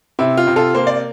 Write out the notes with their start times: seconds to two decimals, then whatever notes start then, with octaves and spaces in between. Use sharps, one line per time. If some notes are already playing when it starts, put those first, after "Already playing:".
0.19 C3 E4
0.37 F4
0.47 C3
0.56 F4 A4
0.74 A#3 C5
0.87 D5